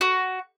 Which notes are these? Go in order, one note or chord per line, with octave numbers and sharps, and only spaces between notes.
F#4